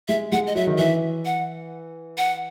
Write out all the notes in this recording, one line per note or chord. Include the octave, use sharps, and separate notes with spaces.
G#3 E5
G#3 F#5
D#5
F#3 E5
D#3
E3 E5
F#5
F#5